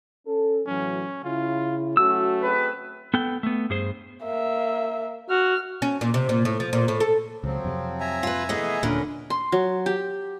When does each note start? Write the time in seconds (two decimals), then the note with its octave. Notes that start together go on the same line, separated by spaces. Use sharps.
0.26 C#4 A4
0.67 A2 E3 F#3 C#4
1.24 C#3 E4 F4
1.97 F#3 A3 C#4 F#4 E6
2.42 C4 G#4 B4
3.14 B3 A4 G5
3.43 A3 B3
3.70 G2 G#4 C5
4.24 A#3 E5
5.30 F#4 F6
5.82 C#4
6.01 A#2
6.14 C3
6.29 A#2
6.45 A2
6.60 F3
6.73 A#2
6.88 A2
7.00 A4
7.44 C#2 F3 F#3 C4
7.65 F2 C3
8.00 E5 G#5 A#5
8.23 F4 B4
8.49 E3 A3 B3 G#4 D#5
8.83 D#1 A#2 D3 C#4 A#4 B4
9.30 C6
9.52 F#3
9.86 G4